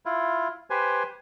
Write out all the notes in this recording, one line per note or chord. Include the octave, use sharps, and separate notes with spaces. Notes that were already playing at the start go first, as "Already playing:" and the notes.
E4 F4
G4 B4 C5 G#5